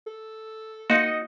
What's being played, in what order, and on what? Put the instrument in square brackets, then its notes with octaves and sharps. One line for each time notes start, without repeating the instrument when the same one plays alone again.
[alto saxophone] A4
[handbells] A#3 [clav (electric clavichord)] D#4 F#4 [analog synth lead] D#5